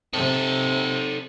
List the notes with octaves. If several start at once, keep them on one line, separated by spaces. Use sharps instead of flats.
C3 D#4 A4